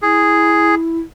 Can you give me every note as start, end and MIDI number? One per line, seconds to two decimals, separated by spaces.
0.02 1.00 64
0.02 0.75 68